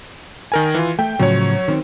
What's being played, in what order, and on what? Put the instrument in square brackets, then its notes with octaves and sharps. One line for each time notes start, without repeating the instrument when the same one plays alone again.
[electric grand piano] D#3 A#4 G#5
E3 F4
[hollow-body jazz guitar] A3 [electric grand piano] G5
[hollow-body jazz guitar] A2 C#3 F3 [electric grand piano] F#3 C#5
[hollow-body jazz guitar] D#3 C4